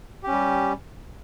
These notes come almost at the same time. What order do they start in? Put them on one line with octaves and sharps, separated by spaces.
G4 C#4 G3